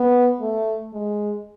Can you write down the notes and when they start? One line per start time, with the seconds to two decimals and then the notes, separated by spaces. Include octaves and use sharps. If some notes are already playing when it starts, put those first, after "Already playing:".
Already playing: B3
0.41 A3
0.93 G#3